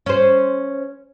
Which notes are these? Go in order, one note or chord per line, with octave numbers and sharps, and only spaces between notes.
C#4 C5